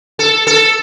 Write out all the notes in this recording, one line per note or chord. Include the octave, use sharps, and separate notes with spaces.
A4
A4